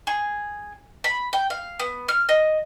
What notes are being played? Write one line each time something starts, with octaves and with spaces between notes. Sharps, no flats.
G#4
B5
G5
F5
B3
F6
D#5